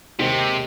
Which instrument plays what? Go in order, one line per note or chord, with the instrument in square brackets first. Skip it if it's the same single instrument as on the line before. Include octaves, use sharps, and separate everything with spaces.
[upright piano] D#2 D#3 G#3 C4 [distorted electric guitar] C3